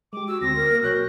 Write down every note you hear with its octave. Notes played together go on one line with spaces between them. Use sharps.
G#3 G4 D6
F#4 E6
D2 C4 A#6
A#4
A#3
B1 F#4 C#5 F#6 G6